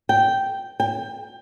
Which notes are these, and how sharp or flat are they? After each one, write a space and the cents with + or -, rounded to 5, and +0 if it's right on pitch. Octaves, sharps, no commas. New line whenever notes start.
G5 -5
G5 +20